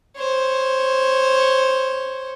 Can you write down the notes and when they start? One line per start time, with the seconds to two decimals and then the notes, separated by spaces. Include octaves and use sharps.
0.16 C5 C#5